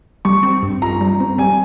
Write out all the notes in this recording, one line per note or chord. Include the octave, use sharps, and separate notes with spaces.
G3 C#6
C4
G2
F4 A#5
G3
C4
G3 G#5